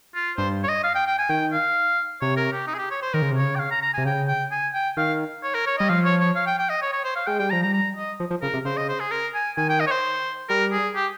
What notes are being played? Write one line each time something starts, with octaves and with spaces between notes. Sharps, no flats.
F4
G2 C5
C#5
D#5
F5
G5
G5
G#5
D#3 G5
F5
C3 C#5
A#4
G4
D#4
G#4
G4
C#5
C5
D#3 A#4
C#3
C3
C#3 C#5
G5
F5
A#5
A#5
G#5
C3
C#3 G5
G5
G#5
G5
D#3 F5
C#5
A#4
C#5
G3 D#5
F3 F5
C#5
C#5
F5
G5
G5
D#5
C#5
C#5
C5
F5
G#3 G5
G3 G5
F3 A#5
G3 A#5
A#5
D#5
F3
F3
C#3 A#4
C3
C#3 C5
D#5
C5
G#4
A#4
G#5
D#3 G#5
G5
D#5
C#5
C5
G3 A#4
G#4
G4